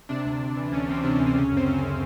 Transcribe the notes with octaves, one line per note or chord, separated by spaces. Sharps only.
C3 D4
D2
C3
E3
D2 C#4
D2 C4
C3 D4
D2 C#4
C4
C#3 C#4
F#2
C4
F#2 C#4